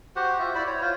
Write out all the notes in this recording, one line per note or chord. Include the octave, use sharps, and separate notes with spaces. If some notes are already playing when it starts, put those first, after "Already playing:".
F#4 G4 C5 F#5
F4 E5
E4 C5 D5 B5
C#5
F4 C5